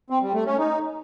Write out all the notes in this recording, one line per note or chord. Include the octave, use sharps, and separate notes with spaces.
C4
G3
A3
C#4
D#4